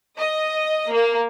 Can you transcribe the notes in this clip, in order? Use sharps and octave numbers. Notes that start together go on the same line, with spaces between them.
D#5
A#3